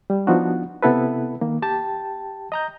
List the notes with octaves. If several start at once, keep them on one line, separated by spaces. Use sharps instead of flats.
G3
F3 B3 D4 D#4 F4 F#4
C3 B3 E4 A4 B4
D#3 A#3
G4 G5 A5
D#5 A#5 G6